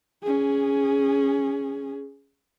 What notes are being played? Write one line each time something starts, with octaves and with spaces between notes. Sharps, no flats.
C#4 G#4